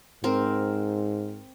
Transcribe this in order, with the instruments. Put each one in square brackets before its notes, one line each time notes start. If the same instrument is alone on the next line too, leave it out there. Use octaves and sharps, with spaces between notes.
[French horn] G#2 [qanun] C4 A#4